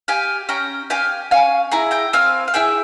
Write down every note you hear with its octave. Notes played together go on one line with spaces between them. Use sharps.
G4 F5 G#5
C#4 G5 A#5
G4 F5 G#5
C#4 F5 G#5
E4 G#4 A#5
G5 A#5
C4 F5 G#5
F5
E4 G#4 E5 G5